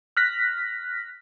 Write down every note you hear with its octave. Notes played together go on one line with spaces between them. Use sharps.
F6 F#6 A#6 B6